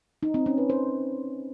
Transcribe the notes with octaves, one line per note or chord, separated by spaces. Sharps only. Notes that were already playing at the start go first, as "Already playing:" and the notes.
D#4
C4
C#4
B4
C5